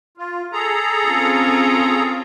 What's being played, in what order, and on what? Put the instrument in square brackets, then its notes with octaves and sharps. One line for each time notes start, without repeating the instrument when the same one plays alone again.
[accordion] F4
G#4 A4 A#5
[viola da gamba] C4 C#4 F4